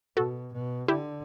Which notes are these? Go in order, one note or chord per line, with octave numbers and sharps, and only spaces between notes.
B2 F#4 A4
B2
D3 E4 G4